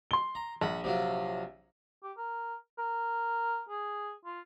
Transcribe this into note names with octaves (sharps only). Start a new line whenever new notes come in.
C6 G7
A#5
A#1 F#5 B5
C3 F#3 F4
G4
A#4
A#4
G#4
F4